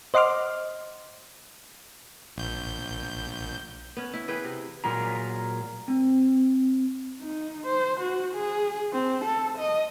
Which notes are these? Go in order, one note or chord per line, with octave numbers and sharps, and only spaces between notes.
C5 D#5 F#5 C6 D6 F6
A#1 G6
B3 C#4
E4
E3 G#4 B4 G5
C3
A#2 F#3 F4 G#4 A#5
C4
D#4
C5
F#4
G#4
C4
A4
D#5